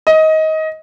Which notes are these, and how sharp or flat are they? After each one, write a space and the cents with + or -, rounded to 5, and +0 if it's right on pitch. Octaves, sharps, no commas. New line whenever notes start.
D#5 +20